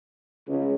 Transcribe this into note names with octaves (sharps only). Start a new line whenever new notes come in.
C#2